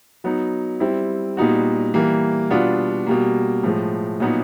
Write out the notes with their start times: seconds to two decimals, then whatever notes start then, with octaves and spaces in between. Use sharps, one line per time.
0.24 F#3 B3 D#4
0.80 G3 C4 E4
1.37 A#2 G3 B3 D#4 F#4
1.94 E3 G3 A#3
2.50 B2 G3 B3 D4 F4
3.07 B2 G3 A#3
3.63 A2 F3 G#3
4.20 A#2 F#3 B3 D#4 F#4